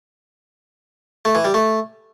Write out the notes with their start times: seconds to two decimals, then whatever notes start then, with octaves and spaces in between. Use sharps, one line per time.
1.25 A3
1.35 E3
1.45 G3
1.54 A3